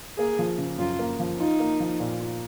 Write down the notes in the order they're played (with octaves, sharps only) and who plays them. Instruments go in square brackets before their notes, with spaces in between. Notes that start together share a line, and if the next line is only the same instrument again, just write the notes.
[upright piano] A#3 [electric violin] G#4
[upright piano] F3
C#3
[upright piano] F#2 [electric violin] F4
[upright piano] A#3
F3
[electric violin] D#4 [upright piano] F4
[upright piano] A#3
F3
A#2
F4